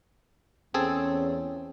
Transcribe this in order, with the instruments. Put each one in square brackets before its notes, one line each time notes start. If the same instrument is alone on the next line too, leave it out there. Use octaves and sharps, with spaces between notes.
[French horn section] E2 C#4 [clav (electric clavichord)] C4 G#4 A4